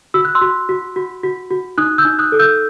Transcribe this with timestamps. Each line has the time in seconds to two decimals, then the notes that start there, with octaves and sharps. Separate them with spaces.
0.14 F#4 E6
0.25 F#6
0.35 C6 E6
0.41 F#4
0.69 F#4
0.96 F#4
1.23 F#4
1.51 F#4
1.78 D#4 D#6 F#6
1.98 E6 G6
2.05 D#4
2.19 D#6 F#6
2.32 A4
2.39 E6 G6